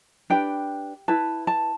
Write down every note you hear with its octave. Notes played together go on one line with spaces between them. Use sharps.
D4 G4 B4 G5
E4 B4 A5
A5